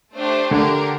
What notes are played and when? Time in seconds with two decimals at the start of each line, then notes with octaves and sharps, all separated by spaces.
0.15 A3 D4 G4 C5
0.51 D3 D4 G4 A#4